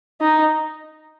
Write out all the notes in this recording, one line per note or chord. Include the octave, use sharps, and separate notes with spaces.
D#4